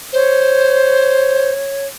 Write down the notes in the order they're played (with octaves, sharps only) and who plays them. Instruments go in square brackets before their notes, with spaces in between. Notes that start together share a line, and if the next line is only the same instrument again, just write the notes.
[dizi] C5 [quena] C#5